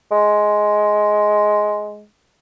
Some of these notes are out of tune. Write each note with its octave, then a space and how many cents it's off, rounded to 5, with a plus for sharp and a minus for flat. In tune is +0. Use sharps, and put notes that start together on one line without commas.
G#3 +10